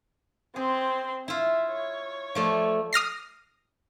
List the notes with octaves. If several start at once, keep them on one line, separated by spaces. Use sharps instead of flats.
C4 G#4 C6
E4 F4 E5
C#5
F3 A3 D5
D#6 F6 A#6 C7